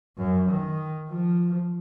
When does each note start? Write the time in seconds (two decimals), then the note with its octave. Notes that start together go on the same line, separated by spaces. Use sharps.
0.17 F#2
0.48 D#3
1.09 F3